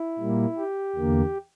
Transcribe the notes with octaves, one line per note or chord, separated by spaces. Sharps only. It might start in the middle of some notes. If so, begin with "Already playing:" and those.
Already playing: E4
A#2 G3 A#3
G4
E2 D3 A#3